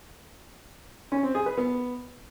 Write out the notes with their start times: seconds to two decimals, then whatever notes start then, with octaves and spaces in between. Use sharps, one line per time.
1.12 C#4
1.23 C4
1.35 G#4
1.46 B4
1.57 B3